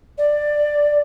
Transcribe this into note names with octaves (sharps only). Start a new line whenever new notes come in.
D5